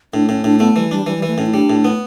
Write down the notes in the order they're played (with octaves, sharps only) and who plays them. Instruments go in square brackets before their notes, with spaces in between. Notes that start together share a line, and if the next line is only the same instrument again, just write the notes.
[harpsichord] A2 [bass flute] D4
[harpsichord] A2 [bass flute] C#4
[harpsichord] A2 [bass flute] D4
[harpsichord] A3 [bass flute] B3
[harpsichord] E3 [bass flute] G3
[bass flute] G3 [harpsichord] D4
[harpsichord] E3 [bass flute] G3
[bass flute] G3
[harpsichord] E3
[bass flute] A3
[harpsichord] A2 [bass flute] C#4
[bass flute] E4
[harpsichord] G3 [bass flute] D4
[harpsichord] A2
B3